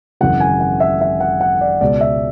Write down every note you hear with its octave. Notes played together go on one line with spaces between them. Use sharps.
G#1 F#2 C#3 E3 G#3 F#5
G#5
F#5
E5
E5
F#5
F#5
D5
C#2 B2 G#3 D5
E5